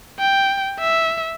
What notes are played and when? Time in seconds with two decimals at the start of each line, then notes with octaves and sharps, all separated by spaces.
0.19 G5
0.79 E5